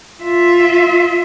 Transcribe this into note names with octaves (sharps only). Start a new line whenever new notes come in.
F4 E5